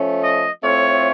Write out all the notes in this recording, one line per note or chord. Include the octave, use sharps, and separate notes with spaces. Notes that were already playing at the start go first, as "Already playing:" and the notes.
Already playing: F3 A3 C#4
D#5
A2 A3 C4 F4 C#5